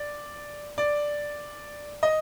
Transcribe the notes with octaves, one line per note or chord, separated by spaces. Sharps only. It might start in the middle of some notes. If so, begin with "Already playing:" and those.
Already playing: D5
D5
D#5